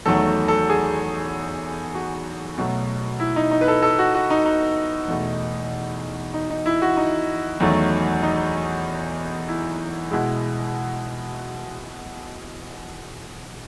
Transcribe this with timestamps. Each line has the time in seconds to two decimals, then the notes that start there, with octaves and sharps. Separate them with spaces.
0.06 E2 D#3 F#3 A3 A4
0.48 A4
0.70 G#4
1.94 F#4
2.58 B2 F#3 A3
3.20 E4
3.36 D#4
3.51 D#4
3.61 B4
3.68 A4
3.83 A4
3.99 F#4
4.14 F#4
4.30 D#4
4.45 D#4
5.08 E2 B2 A3
6.34 D#4
6.50 D#4
6.66 E4
6.82 F#4
6.97 D#4
7.60 E2 D#3 F#3 A3
8.23 D#4
9.48 E4
10.11 B2 G#3 E4